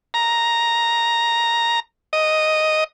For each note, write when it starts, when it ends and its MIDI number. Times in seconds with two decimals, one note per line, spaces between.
0.14 1.80 82
2.13 2.84 75